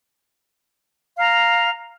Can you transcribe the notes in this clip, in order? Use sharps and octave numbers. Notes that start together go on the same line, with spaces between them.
F5 A#5